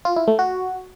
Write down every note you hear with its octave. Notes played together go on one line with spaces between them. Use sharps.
F4
E4
A3
F#4